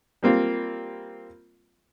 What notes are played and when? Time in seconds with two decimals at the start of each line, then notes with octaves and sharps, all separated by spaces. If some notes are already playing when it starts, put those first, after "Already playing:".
0.23 G3 A#3 C4 F4